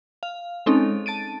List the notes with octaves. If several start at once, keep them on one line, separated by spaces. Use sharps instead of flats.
F5
G#3 C4 C#4 D#4 A4
A5 A6 D7 D#7